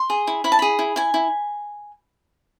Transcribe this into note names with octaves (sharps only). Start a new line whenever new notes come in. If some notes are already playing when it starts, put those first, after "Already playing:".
Already playing: C6
G#4
E4
E4 B5
A5
G#4 B5
E4
E4 G#5
E4